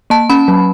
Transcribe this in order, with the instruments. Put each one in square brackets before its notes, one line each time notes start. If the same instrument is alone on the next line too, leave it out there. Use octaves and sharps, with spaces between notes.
[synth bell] A#3 A5
C#4 B5
F#3